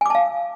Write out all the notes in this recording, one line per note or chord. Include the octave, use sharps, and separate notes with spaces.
F5 G#5 A5 D6